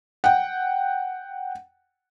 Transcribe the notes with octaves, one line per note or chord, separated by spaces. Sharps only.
F#5 G5